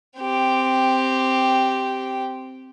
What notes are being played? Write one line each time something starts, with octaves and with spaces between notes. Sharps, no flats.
C4 G4